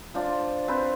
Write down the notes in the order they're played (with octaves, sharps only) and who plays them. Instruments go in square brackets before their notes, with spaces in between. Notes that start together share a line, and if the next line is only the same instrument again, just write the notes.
[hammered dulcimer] D4 F4 C5
C4 B4 C5